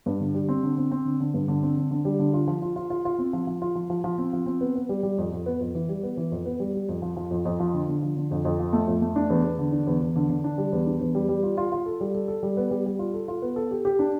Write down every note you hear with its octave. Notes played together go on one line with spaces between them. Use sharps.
G2
D3
G3
C4
D3
C4
C4
D3
D3
G2
D3
C4
D3
D3
G3
D3
F4
F3
F4
F4
F4
F4
C4
F3
F3
F4
F3
F3
F3
C4
F3
C4
B3
B3
G3
G3
F2
F2
B3
F2
E3
G3
B3
E3
F2
B3
G3
G3
F2
F3
F3
F2
F2
F3
D3
D3
F3
D3
F2
F2
F3
A3
F2
A3
D4
E2
E2
D3
D4
E2
E2
D3
D3
D4
G3
E2
D4
E2
G3
G3
F4
F4
F4
A4
G3
A4
A4
G3
B3
G3
G3
F4
A4
F4
B3
A4
G4
G4
D4